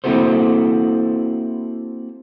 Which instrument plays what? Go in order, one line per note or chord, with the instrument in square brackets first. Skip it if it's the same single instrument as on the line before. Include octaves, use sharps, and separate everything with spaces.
[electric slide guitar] A#3 C4 E4 F#4 A4 C5